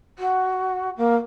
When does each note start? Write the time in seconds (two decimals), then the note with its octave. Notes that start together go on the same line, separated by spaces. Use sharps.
0.18 F#4
0.97 A#3